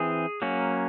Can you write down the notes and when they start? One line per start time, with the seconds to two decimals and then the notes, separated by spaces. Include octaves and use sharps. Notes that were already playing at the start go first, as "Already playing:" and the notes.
Already playing: E3 C4 G#4
0.42 F#3 A#3 C#4